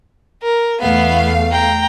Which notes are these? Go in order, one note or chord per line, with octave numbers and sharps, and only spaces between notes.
A#4
E2 A3 B3 F5
G5 A#5